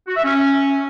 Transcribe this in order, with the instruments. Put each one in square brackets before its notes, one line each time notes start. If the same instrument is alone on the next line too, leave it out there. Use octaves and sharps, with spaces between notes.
[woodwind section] F#4
E5
C#4